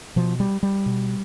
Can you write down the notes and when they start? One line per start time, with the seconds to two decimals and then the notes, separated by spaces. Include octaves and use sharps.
0.16 B2 F3
0.40 G3
0.63 G3
0.86 B2